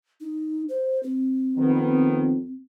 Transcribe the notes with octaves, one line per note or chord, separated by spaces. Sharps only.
D#4
C5
C4
F2 D#3 B3